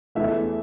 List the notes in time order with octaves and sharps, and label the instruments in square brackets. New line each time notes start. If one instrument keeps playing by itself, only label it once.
[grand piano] E2 E3 A3 E5